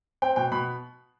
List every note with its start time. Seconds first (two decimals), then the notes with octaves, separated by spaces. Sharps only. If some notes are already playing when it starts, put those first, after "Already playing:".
0.22 C4 G5
0.36 B2 G5
0.52 B2 B5